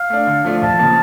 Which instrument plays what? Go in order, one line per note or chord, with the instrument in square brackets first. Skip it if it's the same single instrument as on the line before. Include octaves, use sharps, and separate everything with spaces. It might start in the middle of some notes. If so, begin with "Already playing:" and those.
Already playing: [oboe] F5
[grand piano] A3 D4
D3
F3 A3 D4 F4
[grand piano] F2 [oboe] A5
[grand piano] C#3 F3 A#3